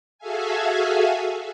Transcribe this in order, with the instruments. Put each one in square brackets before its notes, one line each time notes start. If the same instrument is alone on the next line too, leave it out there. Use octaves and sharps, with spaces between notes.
[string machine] F#4 G#4 A4 E5 F5 G#5